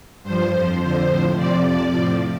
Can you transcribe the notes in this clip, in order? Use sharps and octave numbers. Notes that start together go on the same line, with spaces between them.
G2 F3 C5
F2 F3
F2 D3 F3 C5
A2 F3
F2 C3 F3 D5
F2 C3 F3 D5
A2 F3